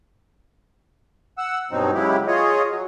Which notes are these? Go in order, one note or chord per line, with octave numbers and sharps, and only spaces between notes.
F#5 E6
G2 B2 F#3 C4 D#4
C#3 F#3 G#3 E4 G4
F4 G#4 C#5 D#5
F#3